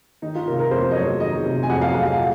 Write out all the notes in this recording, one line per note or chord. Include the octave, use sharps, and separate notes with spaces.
D#3 D#4
F4
C3 A#4
A#4
F2 C5
D#5
F#3 C#5
D#3 D#5
C3
G#5
F2 F#5
F5
F#3 F#5
F5
A#2